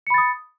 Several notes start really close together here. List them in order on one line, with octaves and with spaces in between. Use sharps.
C#7 B5 A6 D#6